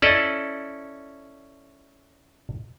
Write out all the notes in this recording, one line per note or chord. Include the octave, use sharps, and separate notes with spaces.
C#4 E4 A4 D5 D#5